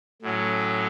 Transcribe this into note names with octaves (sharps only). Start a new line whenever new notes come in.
A2 F#3 C#4